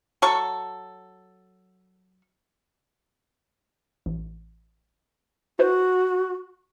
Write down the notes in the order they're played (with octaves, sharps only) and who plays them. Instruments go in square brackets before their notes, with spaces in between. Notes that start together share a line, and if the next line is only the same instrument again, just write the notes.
[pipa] F#3 A4 C#6
[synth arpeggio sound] A1
[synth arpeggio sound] E4 B4 C5 [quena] F#4